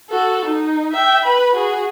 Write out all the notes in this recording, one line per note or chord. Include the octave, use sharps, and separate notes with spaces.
F#4 A4
D#4
E5 G5
B4 B5
F#4 G#4